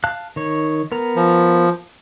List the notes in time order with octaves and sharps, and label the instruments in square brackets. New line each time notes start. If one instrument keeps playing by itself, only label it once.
[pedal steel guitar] F5 A5 F#6
D#3 C#5
B3 A#4 A#5
[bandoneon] F3